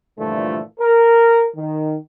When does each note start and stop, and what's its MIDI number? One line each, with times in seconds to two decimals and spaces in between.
0.19 0.61 43
0.19 0.61 46
0.19 0.61 50
0.19 0.61 52
0.19 0.61 53
0.19 0.61 57
0.80 1.47 70
1.57 1.95 51